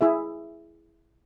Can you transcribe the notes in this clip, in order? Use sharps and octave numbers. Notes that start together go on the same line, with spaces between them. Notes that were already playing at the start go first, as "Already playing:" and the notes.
E4 G#4 E5